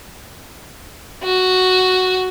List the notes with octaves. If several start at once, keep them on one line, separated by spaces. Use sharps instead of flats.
F#4